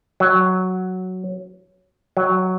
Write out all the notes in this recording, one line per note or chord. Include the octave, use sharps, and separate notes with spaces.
F#3
F#3